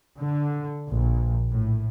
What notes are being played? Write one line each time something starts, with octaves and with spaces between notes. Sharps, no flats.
D3
A#1
A2